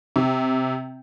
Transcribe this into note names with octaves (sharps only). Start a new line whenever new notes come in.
C3